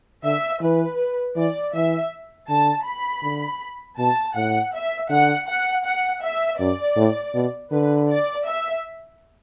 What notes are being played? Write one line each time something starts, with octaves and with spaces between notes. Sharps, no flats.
D3 E5
E3 B4
E3 D5
E3 E5
D3 A5
B5
D3
B2 A5
A2 F#5
E5
D3 F#5
F#5
F#5
E5
F#2 D5
A2
B2
D3 B4
D5
E5